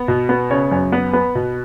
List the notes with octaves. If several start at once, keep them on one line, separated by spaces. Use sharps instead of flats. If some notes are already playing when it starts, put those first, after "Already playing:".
Already playing: B3
B2
B3
C#3 C#5
F#2 C#5
B3 B4
B3 B4
B2